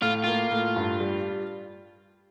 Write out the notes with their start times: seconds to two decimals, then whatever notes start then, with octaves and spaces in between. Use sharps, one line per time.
0.02 A2 F4
0.24 A#3 F4
0.51 A2
0.76 G2
1.00 G3